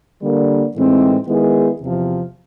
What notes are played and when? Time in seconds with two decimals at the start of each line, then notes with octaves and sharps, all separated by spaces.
0.21 D3 G3 A#3
0.74 A2 E3 G#3 C4 D#4
1.27 D#3 G#3 B3 E4 G#4
1.80 E2 C3 F3